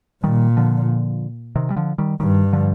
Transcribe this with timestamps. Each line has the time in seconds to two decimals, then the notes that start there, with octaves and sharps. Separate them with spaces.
0.24 A#2 D#3 G3
0.57 D3 F3
1.56 C3 D#3
1.70 G3
1.76 D3 F3
1.98 D#3 G3
2.20 G2 D#3 G3
2.53 D3 F3